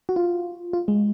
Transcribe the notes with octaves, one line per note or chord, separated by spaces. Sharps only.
F#4
F4
F4
G#3